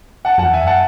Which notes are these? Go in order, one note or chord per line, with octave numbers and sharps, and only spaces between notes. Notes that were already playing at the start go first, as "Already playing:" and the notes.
F#5 A5
F#2 F#5 A5
E2
E5 G#5
F#2 F#5 A5